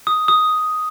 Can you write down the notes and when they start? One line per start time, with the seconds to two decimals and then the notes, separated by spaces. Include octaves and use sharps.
0.07 D#6
0.28 D#6